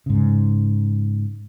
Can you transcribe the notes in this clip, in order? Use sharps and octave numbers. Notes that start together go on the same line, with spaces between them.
G#2 C#3